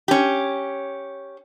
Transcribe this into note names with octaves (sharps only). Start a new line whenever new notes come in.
C#4 G4